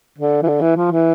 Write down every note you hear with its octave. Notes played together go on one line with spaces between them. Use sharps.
D3
E3
D3
E3
F3
E3